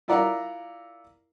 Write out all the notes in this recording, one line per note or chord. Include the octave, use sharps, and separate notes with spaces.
E4 F4 A#4 D5 F#5 A#5